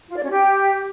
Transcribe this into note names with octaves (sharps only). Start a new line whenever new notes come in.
F4
D5
C#4
G4